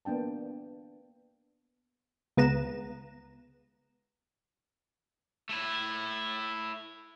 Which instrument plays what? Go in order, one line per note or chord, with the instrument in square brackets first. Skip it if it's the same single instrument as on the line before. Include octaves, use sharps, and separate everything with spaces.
[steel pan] A#3 B3 D4 G5 A5
[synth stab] C#2 B3 A#5 E7
[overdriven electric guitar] A3 E4